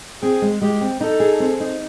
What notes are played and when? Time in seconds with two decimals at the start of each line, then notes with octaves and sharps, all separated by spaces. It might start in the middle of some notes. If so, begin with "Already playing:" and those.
0.22 C4 G#4
0.42 G#3
0.62 G#3 G4
0.81 C4
1.01 D#4 A4
1.20 G#4
1.40 C4
1.60 D#4